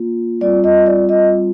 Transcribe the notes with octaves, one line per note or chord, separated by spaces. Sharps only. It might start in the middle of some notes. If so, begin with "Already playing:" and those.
Already playing: A#3 F4
G3 C4 F4 D5
D#5
D5
D#5